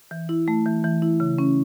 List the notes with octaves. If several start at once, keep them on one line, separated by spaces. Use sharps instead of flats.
E3
E4
A3
E3
E3
E4
C#3
C#4